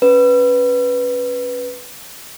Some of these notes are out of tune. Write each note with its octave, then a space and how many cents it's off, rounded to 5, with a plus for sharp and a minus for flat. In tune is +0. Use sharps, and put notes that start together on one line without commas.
C#4 +0 B4 +0